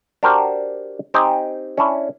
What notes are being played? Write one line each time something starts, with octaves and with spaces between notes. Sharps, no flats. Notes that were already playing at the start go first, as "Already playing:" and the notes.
D4 F#4 G4 A#4 C5
C4 D#4 G4 D#5 G5 G#5
C#4 D4 E4